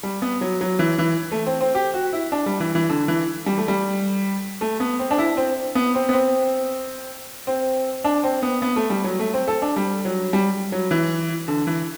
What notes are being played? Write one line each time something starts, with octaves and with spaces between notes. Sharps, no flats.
G3
B3
F#3
F#3
E3
E3
A3
C4
C4
G4
F#4
E4
D4
G3
E3
E3
D3
E3
G3
A3
G3
A3
B3
C4
D4
E4
C4
B3
C4
B3
C4
C4
D4
C4
B3
B3
A3
G3
F#3
A3
C4
A4
D4
G3
F#3
G3
F#3
E3
D3
E3